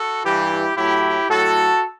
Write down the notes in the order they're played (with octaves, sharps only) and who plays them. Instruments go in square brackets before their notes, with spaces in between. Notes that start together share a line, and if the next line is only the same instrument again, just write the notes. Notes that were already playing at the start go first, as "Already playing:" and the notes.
Already playing: [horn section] F#4 A4
G2 E3 E4 G4
A2 F#3 E4 G4
A2 F#3 F#4 A4